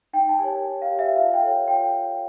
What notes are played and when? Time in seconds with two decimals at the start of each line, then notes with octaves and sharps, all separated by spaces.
0.13 D#4 G5
0.29 A5
0.39 G4 A#4 C#5 G#5
0.65 D#4
0.82 F5
0.90 G4 A#4 C#5
0.99 E5
1.16 F4 F5
1.33 G5
1.42 A4 C#5
1.68 F4 G5